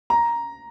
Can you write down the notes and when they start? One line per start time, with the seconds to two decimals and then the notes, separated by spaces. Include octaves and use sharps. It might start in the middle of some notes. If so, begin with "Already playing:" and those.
0.10 A#5